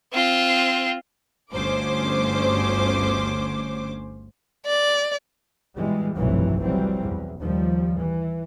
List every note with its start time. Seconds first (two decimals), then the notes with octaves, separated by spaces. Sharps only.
0.13 C4 F4
1.53 G1 D2 C#4 C5 D6
4.66 D5
5.76 B2 E3 G3 G#3
6.16 F1 B1 G2 C3 E3 F#3
6.63 E3 F#3 G3 C4
7.03 E2
7.42 D#2 F3 G3
7.98 E3